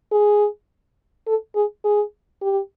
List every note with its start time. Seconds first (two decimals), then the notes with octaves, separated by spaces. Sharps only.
0.12 G#4
1.27 A4
1.56 G#4
1.84 G#4
2.42 G4